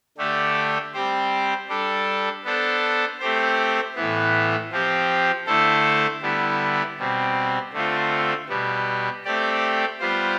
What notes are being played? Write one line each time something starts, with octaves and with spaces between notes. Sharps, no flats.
D3 A3 D4 G4
G3 C4 G4 C5
G3 D4 A4
B3 D4 A4 C5
A3 C4 G4 C5
A2 E3 B3
F3 C4 G4
D3 A3 E4 A4 C5
D3 G3 B3 E4
B2 G3 C4
D3 A3 C4 F4
B2 G3 B3
A3 C4 G4 D5
G3 B3 F4 C5